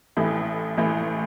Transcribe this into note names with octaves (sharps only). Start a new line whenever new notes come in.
A1 A2 E3
A1 A2 E3